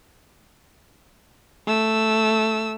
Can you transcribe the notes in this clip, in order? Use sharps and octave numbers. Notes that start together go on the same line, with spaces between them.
A3 E6